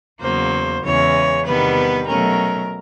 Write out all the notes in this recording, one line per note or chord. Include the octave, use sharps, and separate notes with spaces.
E2 C#3 F#3 A#3 C5
E2 C#3 E3 G#3 C#5
E2 C3 D#3 G3 B3 B4
B2 F#3 A3 C#4 A#4